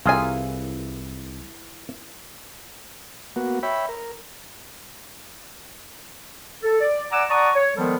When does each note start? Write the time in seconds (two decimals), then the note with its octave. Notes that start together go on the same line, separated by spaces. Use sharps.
0.06 C2 E3 F4 G#4 A#4 G#5
3.36 A#3 B3 F#4
3.63 C#5 E5 G5 B5
3.89 A#4
6.62 A4
6.80 D5
7.12 D5 F#5 G#5 A#5 D6 E6
7.29 D5 F#5 A5 A#5 C#6 D#6
7.55 C#5
7.76 D#3 F3 G3 G#3 B3 A4